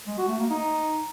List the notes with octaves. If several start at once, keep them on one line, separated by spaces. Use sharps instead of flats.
G#3
F#4
A3
A#3
D#4